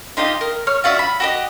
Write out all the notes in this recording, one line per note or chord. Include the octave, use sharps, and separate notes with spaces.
D#4 F4 G4 D#5
A#4
C#5 F6
F4 F#4 D5 E5
B5
F#4 G4 D#5